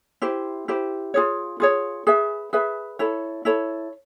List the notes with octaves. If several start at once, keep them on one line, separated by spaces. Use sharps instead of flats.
E4 G4 C5
E4 G4 C5
F4 G#4 C#5
F4 G#4 C#5
G#4 B4 E5
G#4 B4 E5
E4 A4 C#5
E4 A4 C#5